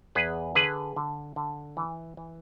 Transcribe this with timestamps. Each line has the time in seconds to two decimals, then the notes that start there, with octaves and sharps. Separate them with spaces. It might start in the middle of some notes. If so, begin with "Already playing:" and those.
0.15 E2 G#4 B4
0.55 D3 G#4 B4
0.96 D3
1.36 D3
1.77 E3
2.17 E3